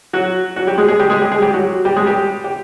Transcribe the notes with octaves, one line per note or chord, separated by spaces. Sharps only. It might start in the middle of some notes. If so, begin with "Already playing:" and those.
F#3 F#4
F#3 F#4
G3 G4
G#3 G#4
G#3 G#4
G3 G4
G#3 G#4
G3 G4
G#3 G#4
G3 G4
F#3 F#4
G3 G4
G#3 G#4
G3 G4
G4